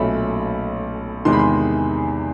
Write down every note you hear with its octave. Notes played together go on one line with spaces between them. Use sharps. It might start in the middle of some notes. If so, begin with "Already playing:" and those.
Already playing: B1 A#2 F#3 A3 C#4 B5
E2 C3 D#3 G#3 C6
B5
C6